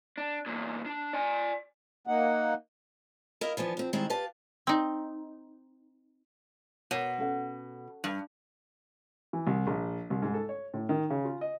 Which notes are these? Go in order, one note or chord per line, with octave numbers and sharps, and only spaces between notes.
D4
E2 A#2
D4
D5 G#5
A#3 D#4 F#5
E4 A#4 D#5 F5
E3 F3 B3 D4
F2 C4
D#3 G3 G#3 C4 E4
G4 B4 F5 A5
C4 D#4
B2 A#4 C#5
C#4 A4 F#5
G2
E3
C2
A#1
C2
G#2
A4
C#5
A2
D#3
C#3
F4
D#5